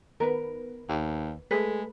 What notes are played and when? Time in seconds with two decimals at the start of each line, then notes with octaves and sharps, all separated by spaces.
0.20 D#3 B3 A#4 B4
0.89 D#2
1.51 G#3 A3 G#4 A4 B4